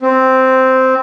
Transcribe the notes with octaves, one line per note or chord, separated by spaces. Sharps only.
C4